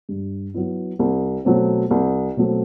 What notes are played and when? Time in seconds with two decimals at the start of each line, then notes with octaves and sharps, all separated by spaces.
0.09 G2
0.54 F#3 B3 E4
0.99 C2
1.45 B2 F#3 A3 C4
1.91 C2
2.37 B2 F#3 A3 C4